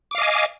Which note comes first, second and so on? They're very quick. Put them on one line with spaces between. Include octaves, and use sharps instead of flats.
D6 F5 D#5 G#5